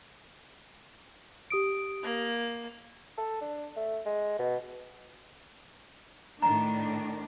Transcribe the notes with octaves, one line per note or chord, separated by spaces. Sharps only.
G4 D#6 D7
A#3
A4
D4
A3
G#3
B2
A2 D#3 D4 A#5